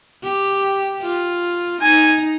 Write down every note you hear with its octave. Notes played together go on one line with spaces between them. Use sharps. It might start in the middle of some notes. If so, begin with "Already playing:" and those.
G4
F4
D#4 G#5